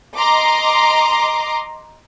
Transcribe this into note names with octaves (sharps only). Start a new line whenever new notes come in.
D#5 A#5 C6 D6